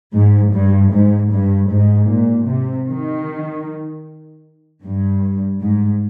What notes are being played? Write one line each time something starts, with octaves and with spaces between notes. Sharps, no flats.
G#2
G2
G#2
G2
G#2
A#2
C3
D#3
G2
G#2